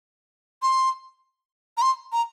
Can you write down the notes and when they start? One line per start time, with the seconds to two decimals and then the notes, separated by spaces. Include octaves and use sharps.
0.62 C6
1.77 A#5
1.82 C6
2.12 A#5